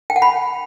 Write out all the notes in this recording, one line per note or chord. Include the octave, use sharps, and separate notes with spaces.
G5
F#5
B5